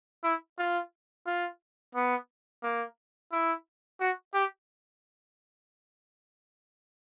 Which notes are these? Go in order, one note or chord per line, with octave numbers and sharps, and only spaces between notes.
E4
F4
F4
B3
A#3
E4
F#4
G4